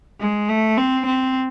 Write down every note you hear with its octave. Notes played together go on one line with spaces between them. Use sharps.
G#3
A3
C4
C4